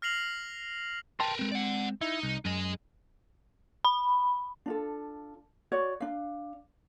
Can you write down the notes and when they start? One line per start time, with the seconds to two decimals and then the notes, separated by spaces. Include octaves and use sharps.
0.02 F6 A#6 C7 F7 F#7
1.20 A#4 B4 G5 A5 C6
1.39 G#3 C4
1.52 D5 F#5
2.01 D#4 E4
2.23 C2
2.45 F#2 G#4 D#5
3.85 B5
4.66 D4 F4 A4
5.72 F#4 C#5 D5
6.00 D4 F5